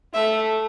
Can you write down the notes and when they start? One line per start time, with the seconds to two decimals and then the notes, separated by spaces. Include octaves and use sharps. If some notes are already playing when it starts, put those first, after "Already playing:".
0.14 A3 E5